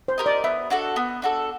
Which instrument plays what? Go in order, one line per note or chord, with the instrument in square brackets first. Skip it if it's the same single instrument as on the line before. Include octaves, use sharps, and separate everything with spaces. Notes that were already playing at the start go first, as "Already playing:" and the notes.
[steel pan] C5
[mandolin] G4 A#4 D#5
[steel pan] D5
[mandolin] B3 [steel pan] E5
[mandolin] D4 F#4 A4
B3
D4 F#4 A4